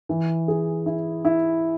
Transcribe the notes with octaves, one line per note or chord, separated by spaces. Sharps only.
E3
G#4
E4
E4